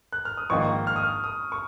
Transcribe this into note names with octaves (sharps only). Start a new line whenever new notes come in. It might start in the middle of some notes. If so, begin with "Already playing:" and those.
F#6
F6
D#6
A#1 G#2 D#3 A#3 F4 C#6
F6
D#6
F6
D#6
C#6